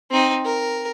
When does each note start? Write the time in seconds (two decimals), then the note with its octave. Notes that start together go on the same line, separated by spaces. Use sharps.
0.11 C4 D#4
0.45 A#4